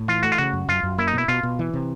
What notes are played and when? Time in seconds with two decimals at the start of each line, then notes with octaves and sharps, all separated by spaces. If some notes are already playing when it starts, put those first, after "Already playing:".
Already playing: A2
0.08 E3 F4
0.23 A3 F#4
0.32 F4
0.38 C#3 F#4
0.53 F#2
0.68 F#2 F4
0.83 F#2
0.98 A#3 E4
1.08 D#4
1.13 B2 E4
1.28 B2 F4
1.43 B2
1.59 E3
1.74 C3